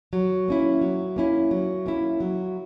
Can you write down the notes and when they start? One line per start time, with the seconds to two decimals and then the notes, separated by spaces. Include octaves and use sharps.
0.13 F#3
0.48 A#3 C#4 E4
0.81 F#3
1.16 A#3 C#4 E4
1.51 F#3
1.86 A#3 C#4 E4
2.20 F#3